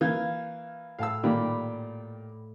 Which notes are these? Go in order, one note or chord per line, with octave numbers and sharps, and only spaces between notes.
E3 A#3 F5 G6 G#6
A2 F5 A5 E6
A#2 D#3 G3 B5 D6